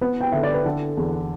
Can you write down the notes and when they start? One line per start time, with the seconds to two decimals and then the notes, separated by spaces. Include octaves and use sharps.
0.01 B3 B4
0.20 G5
0.32 D3 E5
0.43 D5
0.54 B4
0.65 D3 A4
0.97 E2